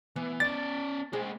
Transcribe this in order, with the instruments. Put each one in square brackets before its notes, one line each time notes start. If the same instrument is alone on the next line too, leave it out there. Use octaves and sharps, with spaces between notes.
[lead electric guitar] E3 [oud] B3
[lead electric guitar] C#4 D5 [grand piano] A6
[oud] G#3 [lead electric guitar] A#3 C5